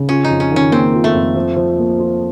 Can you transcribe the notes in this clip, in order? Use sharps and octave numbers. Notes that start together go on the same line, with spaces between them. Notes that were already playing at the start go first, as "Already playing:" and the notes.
Already playing: C#3
C#4 F4
D#4
F2
C#4
D#3 C#4
A#3 C4
F4
A3
F2
F3
F3
A#3
F4